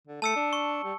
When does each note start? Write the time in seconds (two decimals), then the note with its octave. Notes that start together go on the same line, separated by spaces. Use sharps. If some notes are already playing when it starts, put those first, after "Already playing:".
0.07 D3
0.22 A3 A5 E6 C#7
0.36 D4
0.53 C#6
0.84 G3